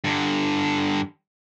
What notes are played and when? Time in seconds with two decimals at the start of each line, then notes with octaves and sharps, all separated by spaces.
0.04 G2 D3